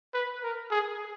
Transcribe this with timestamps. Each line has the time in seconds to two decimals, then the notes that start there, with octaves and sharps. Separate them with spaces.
0.14 B4
0.43 A#4
0.71 G#4